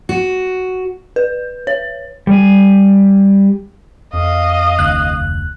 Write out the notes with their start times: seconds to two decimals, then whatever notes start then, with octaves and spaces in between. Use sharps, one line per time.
0.09 F#4
1.16 B4
1.67 C#5
2.27 G3 G#5
4.13 F2 D#5 F5
4.79 F1 D2 F#6